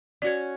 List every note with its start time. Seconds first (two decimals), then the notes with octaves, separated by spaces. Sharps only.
0.22 C#4 F#4 C#5 D5